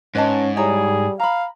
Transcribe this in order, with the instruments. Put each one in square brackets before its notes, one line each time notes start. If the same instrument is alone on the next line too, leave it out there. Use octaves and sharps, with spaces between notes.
[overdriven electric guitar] G#2 [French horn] C#4 [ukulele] B4 D#5 A5
[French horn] G3 [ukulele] E4 C#5 A#5 [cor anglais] G#4
[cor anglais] F5 [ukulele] A#5 B5